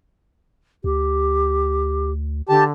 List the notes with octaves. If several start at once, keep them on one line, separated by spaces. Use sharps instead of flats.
D2 G4
D3 G4 A5